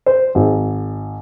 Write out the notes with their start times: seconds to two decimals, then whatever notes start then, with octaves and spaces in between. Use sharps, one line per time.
0.06 C5
0.35 G#1